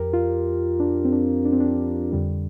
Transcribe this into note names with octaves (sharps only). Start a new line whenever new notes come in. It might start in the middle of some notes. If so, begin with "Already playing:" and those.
Already playing: F2 F3 G4 A#4
F4
D4
C4
D4
D4
C4
D4
F2 D3 G3